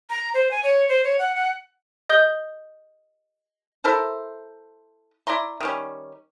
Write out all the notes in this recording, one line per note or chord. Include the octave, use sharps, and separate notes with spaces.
A#5
C5
G#5
C#5
C5
C#5
F#5
F#5
D#5 D#6 G6 G7
E4 A4 A#4 C5
E4 D5 A#5 C6
D#3 G3 C#4